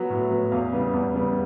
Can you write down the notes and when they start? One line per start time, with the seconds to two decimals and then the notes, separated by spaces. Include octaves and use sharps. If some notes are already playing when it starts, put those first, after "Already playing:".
Already playing: F#3 B3
0.10 A2
0.30 F#3 B3
0.51 E2 F5
0.72 C#3 E3 G3 B3
0.94 E2
1.14 C#3 E3 G3 B3